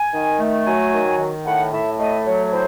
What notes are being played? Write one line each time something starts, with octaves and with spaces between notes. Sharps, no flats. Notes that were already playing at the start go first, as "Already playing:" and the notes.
Already playing: G#5
D#3
A3
F#3 G#5
D#3
D#3
A2 F#5
A2 E5
A3 D#5
F#3 C#5
C#5
A2 C5